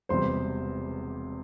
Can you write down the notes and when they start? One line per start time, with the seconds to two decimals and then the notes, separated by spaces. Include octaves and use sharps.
0.09 E1 E2 C3 G3 C5 C6